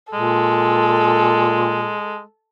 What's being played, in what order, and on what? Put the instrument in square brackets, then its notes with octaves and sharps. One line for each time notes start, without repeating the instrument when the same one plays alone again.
[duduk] A#2 [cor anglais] G#3 [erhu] A4